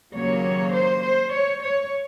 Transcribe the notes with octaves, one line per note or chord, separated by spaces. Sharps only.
D#2 C#3 F#3 A#3 C#5
C5
C5
C#5
C#5